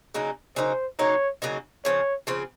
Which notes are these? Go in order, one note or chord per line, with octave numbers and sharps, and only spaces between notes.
C#3 F#3 A#3 D#4
C#3 F#3 A#3 D#4 C5
C#3 F#3 A#3 D#4 C#5
C#3 F#3 A#3 D#4
C#3 F3 C4 C#5
C#3 F3 C4